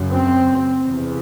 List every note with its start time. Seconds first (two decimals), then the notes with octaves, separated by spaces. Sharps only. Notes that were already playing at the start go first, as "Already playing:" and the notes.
Already playing: F#2 C#3
0.10 C4
0.85 E2 C3